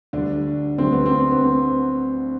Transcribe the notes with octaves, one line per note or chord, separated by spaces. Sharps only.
D2 D3 G3 D4
D2 D3 G3 C4
B3
C4
B3
C4